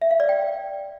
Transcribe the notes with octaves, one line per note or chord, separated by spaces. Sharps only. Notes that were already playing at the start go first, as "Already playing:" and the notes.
E5
F5
D5
G5